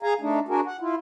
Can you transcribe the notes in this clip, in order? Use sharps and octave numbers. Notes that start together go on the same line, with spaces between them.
G#4 F5 G#5 A#5
A3 D4 D#4
D4 F#4 G#4 A#4
F#5
E4 F4